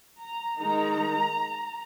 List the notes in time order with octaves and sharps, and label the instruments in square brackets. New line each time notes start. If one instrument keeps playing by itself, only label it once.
[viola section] A#5
D#3 G#3 D#4 A#5